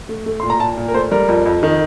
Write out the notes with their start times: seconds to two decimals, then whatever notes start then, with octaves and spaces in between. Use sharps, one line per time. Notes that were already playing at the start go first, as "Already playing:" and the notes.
0.09 A3
0.26 A3
0.40 A#2 C6
0.50 A#5
0.60 A#2 A5
0.78 A#2
0.88 A#4
0.94 A3 C5
1.12 G3 A#4
1.29 F2
1.46 F2
1.63 D#3